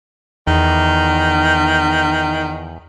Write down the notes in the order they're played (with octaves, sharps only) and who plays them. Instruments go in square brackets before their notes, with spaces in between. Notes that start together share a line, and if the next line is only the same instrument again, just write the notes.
[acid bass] E2 [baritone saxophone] D#3